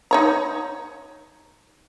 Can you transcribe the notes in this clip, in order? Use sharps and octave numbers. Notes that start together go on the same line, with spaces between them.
D#4 C#5 A#5